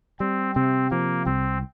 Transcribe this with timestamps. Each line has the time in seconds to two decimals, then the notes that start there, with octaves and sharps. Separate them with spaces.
0.20 G3 C4
0.55 C3 C4
0.90 F3 A#3
1.26 C2 C4